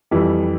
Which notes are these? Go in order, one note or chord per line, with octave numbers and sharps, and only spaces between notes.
F2 E3 G3